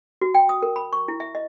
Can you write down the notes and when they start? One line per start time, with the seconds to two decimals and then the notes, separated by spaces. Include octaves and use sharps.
0.21 F#4
0.34 G5
0.49 D#6
0.62 A#4
0.76 B5
0.93 C#6
1.08 E4
1.20 E5
1.35 D#5